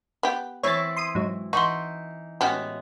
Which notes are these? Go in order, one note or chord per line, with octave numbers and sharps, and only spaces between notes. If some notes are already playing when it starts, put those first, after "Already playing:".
B3 G4
E3 C4 E4 C#5 A6
C6 D#6 D#7
G#2 F#3
E3 D#4 F#4 C6 C#6
A2 G#3 B3 C#4 F#4 G4